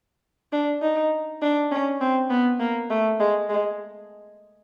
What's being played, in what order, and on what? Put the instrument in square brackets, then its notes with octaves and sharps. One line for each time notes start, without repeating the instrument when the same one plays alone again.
[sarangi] D4
D#4
D4
C#4
C4
B3
A#3
A3
G#3
G#3